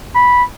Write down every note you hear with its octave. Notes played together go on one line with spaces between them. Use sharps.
B5